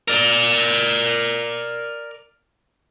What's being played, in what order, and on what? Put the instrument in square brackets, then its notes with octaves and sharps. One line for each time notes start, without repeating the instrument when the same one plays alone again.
[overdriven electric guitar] A#4 D5